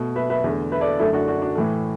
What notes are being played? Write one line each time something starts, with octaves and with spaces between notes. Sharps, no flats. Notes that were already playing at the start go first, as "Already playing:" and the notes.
Already playing: B2 A3
B4 E5
B4 E5
E2 D3 A3
B4 E5
A4 D5
F#2 D3 A3 E4 A4
D4 F#4
D4 F#4
D4
A2 E3 A3